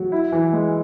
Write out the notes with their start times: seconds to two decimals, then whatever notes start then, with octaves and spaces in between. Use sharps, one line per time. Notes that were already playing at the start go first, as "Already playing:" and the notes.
Already playing: F#3
0.12 E4
0.32 E3
0.53 G#3